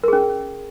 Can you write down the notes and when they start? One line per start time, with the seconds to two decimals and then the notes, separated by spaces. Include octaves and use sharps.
0.04 A#4
0.08 G#4
0.13 C#4